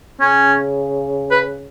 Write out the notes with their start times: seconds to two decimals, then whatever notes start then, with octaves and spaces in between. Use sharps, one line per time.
0.20 C#3 C#4
1.31 B4